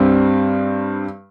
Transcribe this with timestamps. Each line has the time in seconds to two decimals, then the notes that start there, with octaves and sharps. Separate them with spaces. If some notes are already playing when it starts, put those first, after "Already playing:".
Already playing: G2 G3 C4